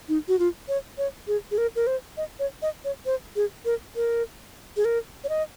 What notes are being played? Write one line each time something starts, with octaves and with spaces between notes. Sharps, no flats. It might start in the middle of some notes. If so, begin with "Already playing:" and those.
D#4
F#4
F4
C#5
C#5
G#4
G#4
A#4
A#4
C5
D#5
C#5
D#5
C#5
C5
G#4
A#4
A#4
G#4
A#4
C#5
D#5